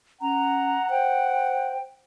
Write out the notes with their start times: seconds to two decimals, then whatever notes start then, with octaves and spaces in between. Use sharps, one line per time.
0.21 C#4 F#5 A#5
0.90 C5 G5